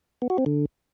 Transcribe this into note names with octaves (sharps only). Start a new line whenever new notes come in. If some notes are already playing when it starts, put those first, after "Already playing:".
B3
F#4
C4
D3